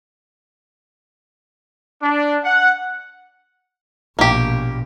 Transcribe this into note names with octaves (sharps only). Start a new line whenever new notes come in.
D4
F#5
A#1 B2 A#3 G4